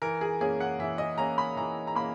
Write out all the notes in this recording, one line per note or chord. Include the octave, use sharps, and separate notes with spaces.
E3 A#4
G#4
A#3 C#4 G#4
F#5
E3 E5
D#5
A#3 C#4 A#5
B5
E3 A#5
A#5
A#3 C#4 B5